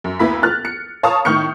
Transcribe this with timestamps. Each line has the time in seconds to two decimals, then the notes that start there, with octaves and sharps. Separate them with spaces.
0.04 F#2
0.19 D2 A#3 B3 E4 B5 B6
0.43 F6 F#6 A6
0.65 C#7
1.03 C#5 F5 A5 A#5 C#6 D#6
1.25 A2 D#3 C#6 F6 G6 C#7